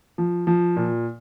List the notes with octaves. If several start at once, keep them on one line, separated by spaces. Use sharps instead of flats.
F3
F3
A#2